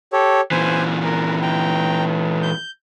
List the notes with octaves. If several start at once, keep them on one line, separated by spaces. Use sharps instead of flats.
G4 A4 C#5
A#2 E3 C5 G#5
A#4
G5 A#5
G6